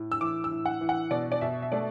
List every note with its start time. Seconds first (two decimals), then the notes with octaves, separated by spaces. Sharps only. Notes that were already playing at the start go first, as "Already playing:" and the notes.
Already playing: A2
0.12 E6
0.20 E3 D6
0.44 E6
0.51 A2
0.66 F#5
0.81 E3
0.89 F#5
1.11 B2 D5
1.32 D5
1.41 B2 E5
1.62 E5
1.72 A3 D5